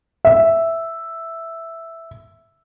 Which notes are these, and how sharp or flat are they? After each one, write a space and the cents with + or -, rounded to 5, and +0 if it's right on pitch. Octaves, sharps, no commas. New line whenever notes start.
E5 +0